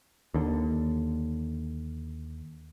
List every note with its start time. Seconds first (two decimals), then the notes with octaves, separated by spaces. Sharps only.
0.34 D#2 D3